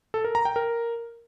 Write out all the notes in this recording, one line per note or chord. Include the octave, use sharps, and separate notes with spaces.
A4
A#4
A#5
G5
A#4